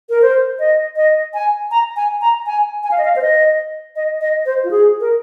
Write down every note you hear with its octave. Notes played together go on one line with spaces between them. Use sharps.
A#4
C5
D#5
D#5
G#5
A#5
G#5
A#5
G#5
G#5
F5
D#5
F5
C5
D#5
D#5
D#5
C5
F4
G#4
A#4